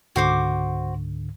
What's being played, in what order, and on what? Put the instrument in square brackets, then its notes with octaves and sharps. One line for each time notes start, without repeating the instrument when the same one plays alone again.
[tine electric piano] C#2 G#2 D3 [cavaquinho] F#4 C5 D6